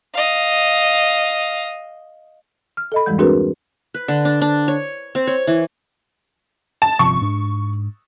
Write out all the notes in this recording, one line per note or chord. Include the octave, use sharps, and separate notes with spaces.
D#5 F5
F6
A4 D#5 B5
F2 G#2 E3 G3 G#3 G6
C4 D4 F#4 G#4 A#4 B4
B4
D3
D4
D4
C#5
C4
C#5
E3
A5
G1 C3 F3 C#6
G#2 D4